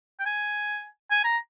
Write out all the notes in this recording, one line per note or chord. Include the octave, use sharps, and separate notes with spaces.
G5
G#5
G#5
A#5